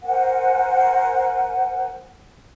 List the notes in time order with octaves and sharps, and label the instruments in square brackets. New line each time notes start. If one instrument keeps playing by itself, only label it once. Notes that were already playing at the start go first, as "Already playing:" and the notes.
[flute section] A#4 C5 F#5 G#5